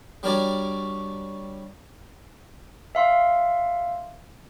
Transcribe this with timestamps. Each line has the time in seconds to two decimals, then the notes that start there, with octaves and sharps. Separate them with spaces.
0.23 G3 D4 F#4 A#4 C#5 D5
2.95 E5 F5 C6